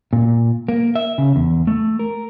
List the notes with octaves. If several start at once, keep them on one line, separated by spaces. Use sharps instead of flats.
A#2
A#3
E5
C#3
E2
A3
A#4